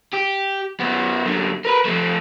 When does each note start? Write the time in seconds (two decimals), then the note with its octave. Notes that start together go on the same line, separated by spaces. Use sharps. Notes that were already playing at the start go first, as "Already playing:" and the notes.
0.13 G4
0.80 F#2 B3
1.26 F#2 D3
1.65 A#4 B4
1.85 F3 A3